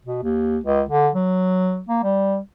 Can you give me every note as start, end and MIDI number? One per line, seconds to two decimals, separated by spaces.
0.05 0.22 47
0.23 0.58 39
0.64 0.82 37
0.89 1.09 50
1.14 1.80 54
1.89 2.00 58
2.03 2.37 55